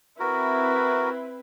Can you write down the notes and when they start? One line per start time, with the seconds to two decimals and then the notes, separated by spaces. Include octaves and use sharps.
0.20 C4 E4 F#4 A#4 B4